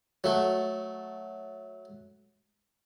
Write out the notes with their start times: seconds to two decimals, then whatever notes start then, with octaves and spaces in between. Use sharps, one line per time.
0.24 F#3 A3